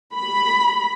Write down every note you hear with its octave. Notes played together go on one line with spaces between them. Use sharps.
B5